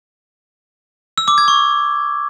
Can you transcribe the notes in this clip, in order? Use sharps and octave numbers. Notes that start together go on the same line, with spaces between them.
E6
D6
G#6
C#6